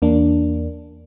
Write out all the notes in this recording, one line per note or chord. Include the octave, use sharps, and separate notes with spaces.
E2 A#3 D4